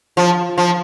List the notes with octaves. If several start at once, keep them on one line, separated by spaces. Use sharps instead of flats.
F3
F3